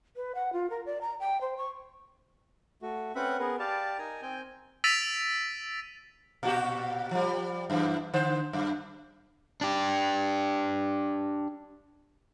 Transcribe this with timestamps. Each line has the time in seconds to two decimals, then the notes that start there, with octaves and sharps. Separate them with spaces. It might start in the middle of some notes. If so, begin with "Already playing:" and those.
0.16 B4
0.35 F#5
0.53 F4
0.70 A#4
0.86 D5
1.01 A#5
1.20 G5
1.41 C5
1.57 C#6
2.82 A3 F#4
3.15 C4 C#4 B4 E5 F#5 B5
3.40 B3 G#4 A#4 B4
3.59 G4 D5 F5 A5
3.98 D#4 A#4 G#5 A#5
4.22 C4 G5 G#5
4.84 E6 A6 B6 D7 D#7 F7
6.43 A#2 F#4 G4
7.11 F3 G3
7.70 F#2 E3
8.14 D3 C5
8.53 F#2
9.61 D4 G4